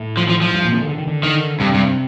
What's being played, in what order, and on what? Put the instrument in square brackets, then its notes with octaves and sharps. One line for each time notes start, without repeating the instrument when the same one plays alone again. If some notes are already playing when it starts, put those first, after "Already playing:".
Already playing: [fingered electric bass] A2
[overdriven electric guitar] F3
F3
F3
[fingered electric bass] G2
A#2
C3
D3
D3
D#3
D3
[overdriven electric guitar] D#3
[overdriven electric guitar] G2 [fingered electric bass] C3
[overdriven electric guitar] G2